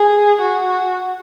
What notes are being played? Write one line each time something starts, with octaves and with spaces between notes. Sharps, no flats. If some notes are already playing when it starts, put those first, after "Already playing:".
Already playing: G#4
F#4